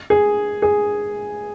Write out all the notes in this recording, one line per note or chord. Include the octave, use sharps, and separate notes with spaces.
G#4
G#4